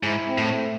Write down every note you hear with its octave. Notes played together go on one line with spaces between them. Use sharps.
G#2 E4
C4
A2
A3